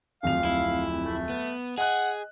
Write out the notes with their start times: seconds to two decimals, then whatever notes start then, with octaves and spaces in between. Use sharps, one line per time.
0.23 D1 F2 F5 F7
0.45 E4
1.03 A3
1.30 B3
1.78 G#4 D#5 F#5 F#6